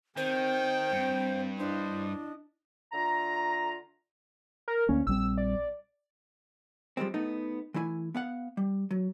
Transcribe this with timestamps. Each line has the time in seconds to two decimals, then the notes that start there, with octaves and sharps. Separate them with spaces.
0.17 D#3 C4 C5 G5
0.92 G2 C4
1.59 D4 E4 C5 D#5
2.92 D3 A3 F4 A#5
4.68 A#4
4.89 D2 A#3 C#4
5.07 A#1 G3 C4 E6
5.38 D5
6.97 F3 G3 G#3 C4
7.14 A3 B3 D#4
7.74 E3 A3 E4 E5 G#5
8.15 B3 F5 F#5
8.57 G3
8.91 F#3